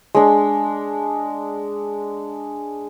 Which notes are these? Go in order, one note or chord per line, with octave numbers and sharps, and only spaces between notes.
G#3 D4